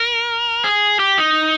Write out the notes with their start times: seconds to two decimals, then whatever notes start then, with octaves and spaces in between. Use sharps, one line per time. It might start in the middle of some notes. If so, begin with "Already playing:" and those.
Already playing: A#4
0.64 G#4
0.99 G4
1.18 D#4